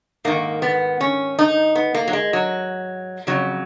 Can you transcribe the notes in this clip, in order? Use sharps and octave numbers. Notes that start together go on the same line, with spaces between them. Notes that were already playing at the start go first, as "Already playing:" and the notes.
G#2 D#3 A#3
B3
C#4
D#4
B3
A#3
F#3
G#3
F#3
F2 C#3 F#3